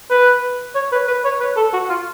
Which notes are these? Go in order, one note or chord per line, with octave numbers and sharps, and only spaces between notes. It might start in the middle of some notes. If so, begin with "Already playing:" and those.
B4
C#5
B4
B4
C#5
B4
A4
F#4
F4